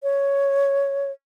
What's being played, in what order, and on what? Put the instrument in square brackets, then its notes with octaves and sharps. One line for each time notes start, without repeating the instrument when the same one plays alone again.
[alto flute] C#5